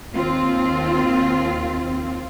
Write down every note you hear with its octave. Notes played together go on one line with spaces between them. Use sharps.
D#2 C4 F4